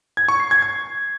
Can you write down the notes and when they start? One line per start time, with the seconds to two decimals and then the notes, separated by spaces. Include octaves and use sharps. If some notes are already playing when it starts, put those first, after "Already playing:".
0.17 G#6
0.28 C#6
0.40 C7
0.51 G#6
0.62 G#6